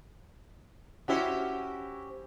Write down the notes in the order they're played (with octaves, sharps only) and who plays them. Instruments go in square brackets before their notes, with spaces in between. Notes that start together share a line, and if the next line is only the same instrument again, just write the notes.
[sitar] C#4 G4 C5 [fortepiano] E4 F#4